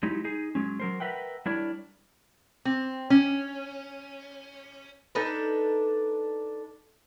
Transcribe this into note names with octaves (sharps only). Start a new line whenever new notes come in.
F#3 G#3 D#4 E4 G4
D#4 G#4
F#3 G#3 C#4
F#3 A#4 C5
A#4 B4 E5 F#5 G5
G3 D4 E4 A#4 C#5 D5
C4
C#4
D4 D#4 A4 B4